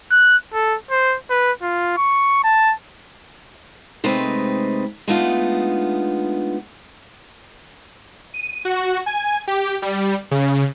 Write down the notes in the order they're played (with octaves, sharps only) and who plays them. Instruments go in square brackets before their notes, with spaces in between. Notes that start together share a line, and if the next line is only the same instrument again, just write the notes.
[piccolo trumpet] F#6
A4
C5
B4
F4
C#6
A5
[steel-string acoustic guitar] C3 G#3 A3 C4 D#4 B4
G#3 A3 B3 D4 D#4 F4
[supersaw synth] D#7
F#4
G#5
G4
G3
C#3